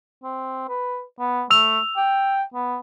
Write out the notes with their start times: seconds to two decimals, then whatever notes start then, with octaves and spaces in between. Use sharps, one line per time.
0.23 C4
0.69 B4
1.20 B3
1.51 A3 E6 F7
1.97 G5
2.54 B3